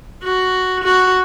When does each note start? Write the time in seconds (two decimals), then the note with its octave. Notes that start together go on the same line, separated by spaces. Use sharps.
0.23 F#4
0.84 F#4